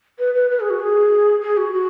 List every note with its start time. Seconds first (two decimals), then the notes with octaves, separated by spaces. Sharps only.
0.19 B4
0.35 B4
0.50 B4
0.60 G#4
0.70 F#4
0.80 G#4
1.42 G#4
1.57 F#4
1.72 F#4